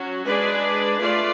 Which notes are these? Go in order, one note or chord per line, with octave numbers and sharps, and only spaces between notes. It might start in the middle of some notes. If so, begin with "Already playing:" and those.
Already playing: F#3 C#4 F#4
G#3 D4 G#4 B4 D5
A3 F4 B4 D5